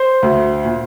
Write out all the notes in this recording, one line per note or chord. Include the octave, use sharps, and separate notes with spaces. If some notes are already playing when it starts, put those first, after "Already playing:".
Already playing: C5
D2
A#2